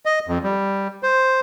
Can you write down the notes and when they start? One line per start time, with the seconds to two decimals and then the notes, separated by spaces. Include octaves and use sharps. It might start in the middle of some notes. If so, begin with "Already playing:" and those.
0.06 D#5
0.27 F2
0.44 G3
1.03 C5